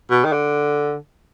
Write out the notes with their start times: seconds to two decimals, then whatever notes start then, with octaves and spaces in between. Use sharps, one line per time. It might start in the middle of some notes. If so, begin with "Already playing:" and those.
0.11 B2
0.24 D#3
0.33 D3